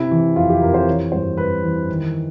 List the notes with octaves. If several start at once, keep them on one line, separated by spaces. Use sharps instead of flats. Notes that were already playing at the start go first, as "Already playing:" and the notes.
Already playing: C3 E4
E3
F2 F4
G4
F2 A#4
C5
E3 C#5
G2 C5
G2 B4
E3
D#3